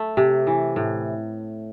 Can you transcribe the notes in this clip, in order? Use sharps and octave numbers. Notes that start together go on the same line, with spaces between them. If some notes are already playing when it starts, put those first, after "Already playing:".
Already playing: A3
C3
E3
A2